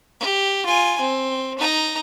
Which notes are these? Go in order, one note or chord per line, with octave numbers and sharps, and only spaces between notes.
G4
F4 G#5
C4
D#4 A#5